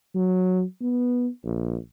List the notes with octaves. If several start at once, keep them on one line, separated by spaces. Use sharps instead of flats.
F#3
B3
A#1